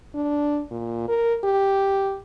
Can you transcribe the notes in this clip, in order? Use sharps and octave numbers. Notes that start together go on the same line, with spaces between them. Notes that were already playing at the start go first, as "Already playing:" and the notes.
D4
A#2
A#4
G4